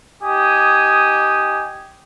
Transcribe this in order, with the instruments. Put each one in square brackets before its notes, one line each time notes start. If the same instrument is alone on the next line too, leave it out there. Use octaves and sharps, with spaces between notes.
[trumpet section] D#4 G4 G#5 D#6